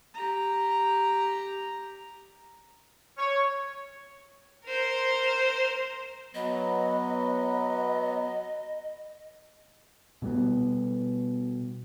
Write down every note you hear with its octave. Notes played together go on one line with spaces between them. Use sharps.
G4 A#5
C#5
A#4 C5
F#3 B3 D#5
B2 G3 G#3 B3